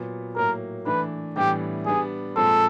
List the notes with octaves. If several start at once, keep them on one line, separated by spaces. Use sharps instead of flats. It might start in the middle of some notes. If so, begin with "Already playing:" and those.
Already playing: A#2 F#3 B3
A2 F#3 A#3 A#4
E3 A3 D4 B4
A2 E3 G3 B3 D4 G4
G3 B3 D4 G#4
A#2 F3 G#3 C4 A4